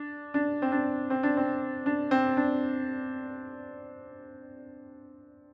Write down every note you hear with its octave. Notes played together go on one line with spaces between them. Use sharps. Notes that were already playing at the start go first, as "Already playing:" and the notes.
Already playing: D4
D4
C4
D4
C4
D4
C4
D4
C4
D4